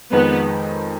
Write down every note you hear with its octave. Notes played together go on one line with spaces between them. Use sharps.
F2 D#3 G#3 B3 D#4